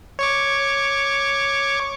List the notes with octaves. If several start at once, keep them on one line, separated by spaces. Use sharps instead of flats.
C#5 C#6 D6